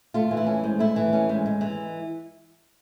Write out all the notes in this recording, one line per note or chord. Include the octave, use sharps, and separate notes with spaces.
A3 F4
E3
E4
C#4
G#2
A3 E4
E3
C#4
G#2
G#3
E3